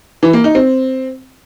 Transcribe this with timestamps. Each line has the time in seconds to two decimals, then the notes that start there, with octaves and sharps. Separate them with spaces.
0.23 E3
0.33 A#3
0.44 D#4
0.55 C4